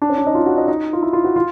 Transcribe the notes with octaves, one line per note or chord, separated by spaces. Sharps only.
D4
C#4
D4
D#4
F4
F#4
D#4
D#4
F4
E4
F4
F#4
F4